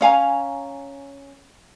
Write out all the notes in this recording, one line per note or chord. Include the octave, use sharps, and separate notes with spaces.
C#4 F5 G#5 A#5